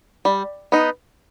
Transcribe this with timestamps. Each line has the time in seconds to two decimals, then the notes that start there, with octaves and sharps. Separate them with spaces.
0.25 G3
0.72 B3 D#4